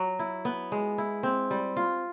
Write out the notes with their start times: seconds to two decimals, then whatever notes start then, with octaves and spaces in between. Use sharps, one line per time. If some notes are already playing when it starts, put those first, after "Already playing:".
Already playing: F#3
0.19 E4
0.45 B3
0.72 G#3
0.98 E4
1.23 C4
1.51 G3
1.77 F4